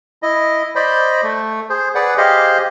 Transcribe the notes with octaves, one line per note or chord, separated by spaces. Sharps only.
E4 D#5
C5 D5 D#5 B5
A3
G#4 C5
G#4 B4 D5 F#5
G4 G#4 C5 D#5 F5